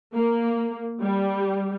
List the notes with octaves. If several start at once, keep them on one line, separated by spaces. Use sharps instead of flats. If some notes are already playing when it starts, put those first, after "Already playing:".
A#3
G3